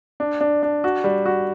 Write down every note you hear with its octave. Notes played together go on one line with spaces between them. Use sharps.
D4
D4
D4
F#4
G3
F#4